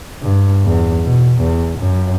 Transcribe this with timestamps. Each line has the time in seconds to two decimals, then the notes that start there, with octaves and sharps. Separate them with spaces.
0.22 G2
0.65 E2
1.05 B2
1.41 E2
1.80 F#2